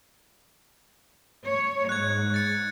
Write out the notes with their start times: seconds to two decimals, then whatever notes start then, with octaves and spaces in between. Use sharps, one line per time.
1.45 C#5
1.89 G#2 F#6 G#6
2.34 A6 C#7